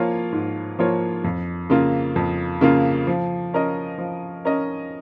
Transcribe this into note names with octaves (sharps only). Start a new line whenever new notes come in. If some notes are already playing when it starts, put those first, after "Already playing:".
Already playing: F3 A#3 F4 C#5
G#2
F3 A#3 F4 C#5
F2
C#3 A#3 F4
F2
C#3 A#3 F4
F3
C#4 A#4 D#5
F3
C#4 A#4 D#5